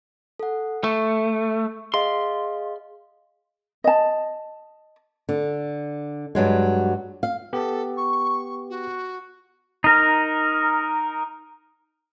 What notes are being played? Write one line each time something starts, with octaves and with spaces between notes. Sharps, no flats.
A4 F#5
A3 C#6
G#4 D#5 F5 C6
D#5 A5
D3
G2 F#3 G#3
F5
B3 G4 A4
C#6
F#4
D#4 A#4